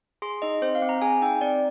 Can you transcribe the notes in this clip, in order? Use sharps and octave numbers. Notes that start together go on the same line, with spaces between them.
G#4 C6
D#4 D#5
C4 C5
F5
C4
A#5
G#4 G#5
D#4 G5
C4 D5